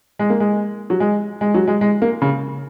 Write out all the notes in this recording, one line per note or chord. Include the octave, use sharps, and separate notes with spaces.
G#3
A#3
G#3
F#3
G#3
G#3
F#3
G#3
G#3
A#3
C#3